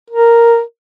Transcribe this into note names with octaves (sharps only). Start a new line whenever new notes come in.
A#4